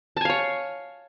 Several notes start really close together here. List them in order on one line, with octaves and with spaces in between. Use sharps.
A5 G#5 F5 C#5